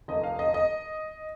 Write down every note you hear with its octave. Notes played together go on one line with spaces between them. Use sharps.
F1 D#2 D3 A3 D#5
F5
D#5
D#5